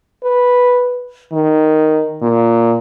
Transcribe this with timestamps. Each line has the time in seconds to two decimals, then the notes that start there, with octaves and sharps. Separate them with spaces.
0.24 B4
1.33 D#3
2.22 A#2